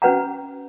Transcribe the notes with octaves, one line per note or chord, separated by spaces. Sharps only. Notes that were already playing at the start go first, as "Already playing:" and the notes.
C#4 F#4 B4 F#5 A#5